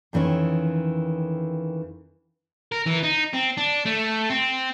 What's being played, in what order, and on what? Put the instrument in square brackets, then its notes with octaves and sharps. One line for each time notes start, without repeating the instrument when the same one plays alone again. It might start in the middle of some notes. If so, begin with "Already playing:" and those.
[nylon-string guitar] F2 D#3 E3 C#4 C#5
[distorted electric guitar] A#4
E3
D#4
C4
D4
A3
C4